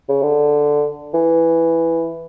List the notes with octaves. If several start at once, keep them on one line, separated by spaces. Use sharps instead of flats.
C#3
D3
E3